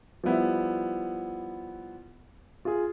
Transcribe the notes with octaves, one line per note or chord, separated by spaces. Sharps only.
F3 G3 B3 E4
F4 G#4